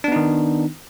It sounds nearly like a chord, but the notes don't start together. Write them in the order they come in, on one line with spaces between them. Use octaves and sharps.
D4 B3 D#4 D#3